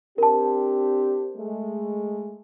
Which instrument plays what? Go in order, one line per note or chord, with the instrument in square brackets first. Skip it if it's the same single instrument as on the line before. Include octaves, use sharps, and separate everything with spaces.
[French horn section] C4 D4 G4 [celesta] A#4 A5
[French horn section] G#3 A3